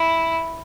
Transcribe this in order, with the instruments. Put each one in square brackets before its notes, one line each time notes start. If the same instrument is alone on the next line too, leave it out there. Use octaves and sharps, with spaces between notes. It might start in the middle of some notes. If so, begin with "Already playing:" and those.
Already playing: [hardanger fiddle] E4